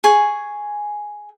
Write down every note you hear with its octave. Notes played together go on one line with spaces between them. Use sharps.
G#4 G#5 C#6